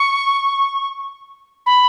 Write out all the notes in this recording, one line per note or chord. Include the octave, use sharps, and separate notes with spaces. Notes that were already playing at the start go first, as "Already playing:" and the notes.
Already playing: C#6
B5